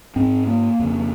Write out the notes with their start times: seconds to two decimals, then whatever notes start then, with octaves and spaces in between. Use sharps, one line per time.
0.16 G#2 C4
0.47 A#3
0.79 F2 C#3